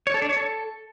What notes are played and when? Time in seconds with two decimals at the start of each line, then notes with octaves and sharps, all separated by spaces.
0.07 C#5
0.14 A4
0.22 D4
0.29 C#5
0.37 A4